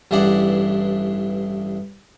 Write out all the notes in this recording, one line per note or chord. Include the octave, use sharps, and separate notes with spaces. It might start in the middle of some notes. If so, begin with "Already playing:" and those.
A1 G2 E3 G#4 D5 F#5